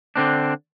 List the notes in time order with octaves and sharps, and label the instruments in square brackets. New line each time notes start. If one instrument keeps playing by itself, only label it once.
[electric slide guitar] D3 C4 D4